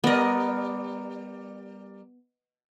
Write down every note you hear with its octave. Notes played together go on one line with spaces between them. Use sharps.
G3 B3 A#4 D5 D#5